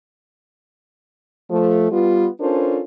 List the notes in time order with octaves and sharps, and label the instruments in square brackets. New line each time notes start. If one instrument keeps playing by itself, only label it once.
[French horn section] F3 A3
G3 B3 F4
C#4 D4 F4 A4 A#4 C5